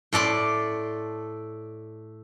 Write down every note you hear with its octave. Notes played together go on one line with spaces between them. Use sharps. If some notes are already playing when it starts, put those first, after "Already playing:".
A2 A4 D5 C6